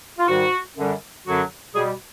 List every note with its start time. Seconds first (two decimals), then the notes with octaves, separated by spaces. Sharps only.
0.19 F4
0.28 G#2 D#3 G3 F#4
0.77 F#2 D3 G3
1.25 F#2 D3 F#3 F#4
1.74 B2 G3 G#4